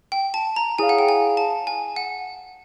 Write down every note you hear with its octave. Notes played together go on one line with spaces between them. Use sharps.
G5
A5
A#5
E4 G#4 C#5 F5 G#5
F#5
G5
G#5
A5
G#5
F#5